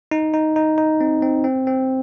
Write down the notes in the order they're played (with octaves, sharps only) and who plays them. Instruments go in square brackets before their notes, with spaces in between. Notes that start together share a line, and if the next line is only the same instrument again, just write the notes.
[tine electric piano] D#4
D#4
D#4
D#4
C4
C4
C4
C4